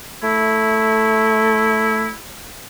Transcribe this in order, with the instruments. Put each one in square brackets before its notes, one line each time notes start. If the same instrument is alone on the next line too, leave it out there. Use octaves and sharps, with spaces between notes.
[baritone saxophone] A3 [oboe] E4